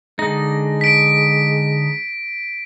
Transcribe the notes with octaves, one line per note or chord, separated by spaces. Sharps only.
D3 G#3 D#4 A#6
B6 D7